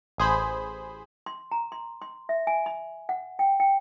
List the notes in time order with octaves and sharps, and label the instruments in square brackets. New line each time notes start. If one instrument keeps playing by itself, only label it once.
[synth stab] A1 G#4 C5 B5
[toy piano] C6
A#5
C6
C6
E5
G#5
B5
F#5
G5
G5